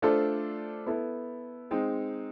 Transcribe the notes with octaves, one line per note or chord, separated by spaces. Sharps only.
A3 D4 F4 A4 C5
B3 E4 A4
G#3 C4 D#4